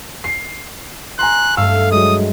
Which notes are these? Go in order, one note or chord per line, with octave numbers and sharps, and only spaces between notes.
C7
G#5 A#5 C6 F#6
G2 A3 F5 E6
F#3 G#3 D#6